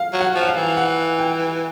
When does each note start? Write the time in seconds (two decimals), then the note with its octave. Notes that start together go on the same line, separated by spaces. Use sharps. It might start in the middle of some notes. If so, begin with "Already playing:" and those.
Already playing: F5
0.13 F#3
0.20 F#5
0.35 F3
0.43 F#5
0.49 F5
0.56 E3
0.77 F#5
1.19 G5